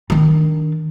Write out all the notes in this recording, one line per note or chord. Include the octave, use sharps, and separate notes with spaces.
D#3 D4